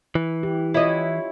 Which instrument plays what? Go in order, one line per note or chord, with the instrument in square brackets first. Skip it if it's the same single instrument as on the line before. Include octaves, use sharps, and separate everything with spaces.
[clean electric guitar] E3
[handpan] E4 G4
[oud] E4 D#5 [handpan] F4 C#5 E5